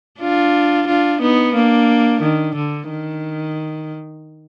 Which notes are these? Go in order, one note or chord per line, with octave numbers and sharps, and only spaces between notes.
D4 F4
D4 F4
B3 D#4
A#3 D4
D#3
D3
D#3